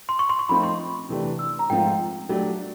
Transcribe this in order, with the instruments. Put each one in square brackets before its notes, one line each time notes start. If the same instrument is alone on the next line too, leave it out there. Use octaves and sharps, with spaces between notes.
[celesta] C6
C#6
C6
C#6
[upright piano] F3 A3 C4 D#4 [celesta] B5
[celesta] C6
[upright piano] C3 E3 A3 D4 G4
[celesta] E6
A#5
[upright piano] G#2 F3 A3 C4 F4 [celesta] G5
[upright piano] F#3 A3 D4 G4